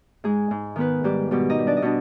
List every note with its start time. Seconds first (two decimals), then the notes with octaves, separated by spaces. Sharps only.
0.24 G#2 G#3 G#4
0.51 G#2
0.76 D#3 B3 B4
1.04 G#2 G3 G4
1.31 B2 G3 G4
1.49 D#4 D#5
1.59 G3
1.67 D4 D5
1.77 D#5
1.82 B2 D4